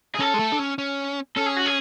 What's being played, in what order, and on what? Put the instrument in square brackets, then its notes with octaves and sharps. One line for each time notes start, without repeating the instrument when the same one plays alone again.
[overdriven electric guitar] G#4
[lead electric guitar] C#4 [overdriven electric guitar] A4
[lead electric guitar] G#3
A3
D4
C#4
C#4
[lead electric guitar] C#4 [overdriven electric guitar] A4
[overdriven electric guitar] G#4
F#4
G#4